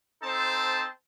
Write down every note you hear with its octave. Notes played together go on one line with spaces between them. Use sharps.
C4 D#4 A4 C5 A5